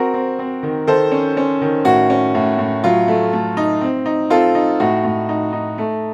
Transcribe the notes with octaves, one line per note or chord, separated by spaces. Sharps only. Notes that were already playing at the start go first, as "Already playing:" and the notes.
Already playing: C4 F#4 A#4
C4
C4
D#3
D#3 A4 C5
C#4
C#4
D#3
A2 F#4
C#4
A2
A2
F#3 F4
A3
A3
D#4
C4
D#4
C4 F4 A4
D#4
A2 F#4
A2
D#4
D#4
A3